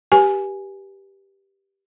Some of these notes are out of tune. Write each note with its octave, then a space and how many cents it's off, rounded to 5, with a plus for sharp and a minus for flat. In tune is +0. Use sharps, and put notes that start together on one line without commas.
G4 +0 B4 -30 G#5 +0